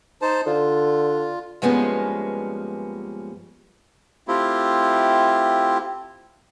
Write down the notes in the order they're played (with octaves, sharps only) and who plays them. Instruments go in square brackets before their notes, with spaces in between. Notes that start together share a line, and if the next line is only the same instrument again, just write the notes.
[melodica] D#4 C5 A5
[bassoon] D3 [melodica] F4
[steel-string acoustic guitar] G2 F3 G#3 A#3 B3 C#4
[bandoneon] A3 C4 E4 F4 G4